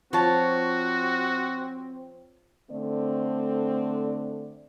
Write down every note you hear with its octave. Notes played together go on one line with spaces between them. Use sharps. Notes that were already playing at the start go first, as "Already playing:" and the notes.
F3 C4 F#4 C#5 A5
D3 A3 C4 D5